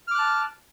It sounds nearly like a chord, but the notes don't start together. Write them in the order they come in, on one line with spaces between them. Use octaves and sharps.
F6 D6 F#6 A5